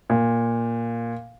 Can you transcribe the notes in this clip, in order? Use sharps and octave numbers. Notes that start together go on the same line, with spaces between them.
A#2